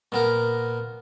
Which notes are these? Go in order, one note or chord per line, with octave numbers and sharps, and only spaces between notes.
A#2 B3 A#4